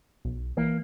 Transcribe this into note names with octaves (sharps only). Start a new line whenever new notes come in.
B1
E3 A#3